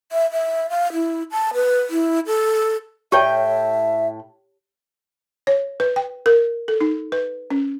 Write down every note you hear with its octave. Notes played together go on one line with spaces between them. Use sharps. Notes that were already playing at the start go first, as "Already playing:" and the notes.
E5
E5
F5
E4
A5
B4
E4
A4
A2 G4 C#5 E5 G5 A5
C#5
B4
G5
A#4
A4
D#4
B4
C#4